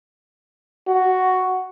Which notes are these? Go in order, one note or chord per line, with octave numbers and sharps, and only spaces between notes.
F#4